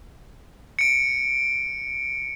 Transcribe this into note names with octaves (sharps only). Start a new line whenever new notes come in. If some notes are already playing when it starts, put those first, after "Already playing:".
C#7 D7